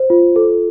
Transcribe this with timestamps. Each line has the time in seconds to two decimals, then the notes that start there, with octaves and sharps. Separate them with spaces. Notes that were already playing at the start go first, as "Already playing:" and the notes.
Already playing: C5
0.10 F4
0.36 A4